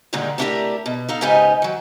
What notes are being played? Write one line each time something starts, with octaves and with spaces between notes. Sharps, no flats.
A#2 D3 D#3 G3 G#3
A3 B3 D4 E4 G4 A#4
B2
D#4 A4 F5
G#2 C#3 D#4 G4 B4 G#5
D#3 F#3